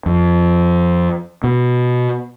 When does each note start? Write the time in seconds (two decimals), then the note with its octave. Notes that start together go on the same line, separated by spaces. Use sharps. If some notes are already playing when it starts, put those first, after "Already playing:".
0.06 F2
1.44 B2